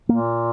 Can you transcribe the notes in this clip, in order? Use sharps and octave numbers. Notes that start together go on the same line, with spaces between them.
A#2 A#3